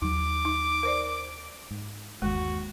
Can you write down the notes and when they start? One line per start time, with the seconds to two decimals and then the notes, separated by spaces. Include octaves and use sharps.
0.02 D#2 F#3 D#4 D6
0.45 D#4
0.83 A#4 C5 D5
1.71 G#2
2.22 G1 D#2 G#3 F#4